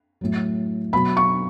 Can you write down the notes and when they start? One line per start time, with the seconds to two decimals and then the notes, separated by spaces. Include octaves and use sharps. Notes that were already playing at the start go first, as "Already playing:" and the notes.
0.21 A2 F#3
0.93 B2 F#3 B5
1.17 C#6